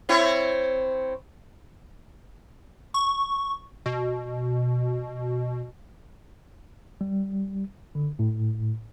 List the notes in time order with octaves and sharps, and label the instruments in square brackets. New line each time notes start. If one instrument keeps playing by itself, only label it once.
[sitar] C4 E4 C#5
[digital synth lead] C#6
B2
[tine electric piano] G3
D3
A2